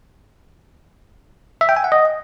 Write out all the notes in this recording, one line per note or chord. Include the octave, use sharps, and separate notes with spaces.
E5
G5
G#5
F#5
D#5